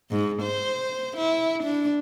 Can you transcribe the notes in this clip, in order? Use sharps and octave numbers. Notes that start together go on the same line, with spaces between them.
G#2
C5
E4
D4